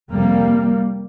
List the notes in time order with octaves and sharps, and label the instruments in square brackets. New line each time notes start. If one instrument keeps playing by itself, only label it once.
[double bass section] F2 C3 G3 A#3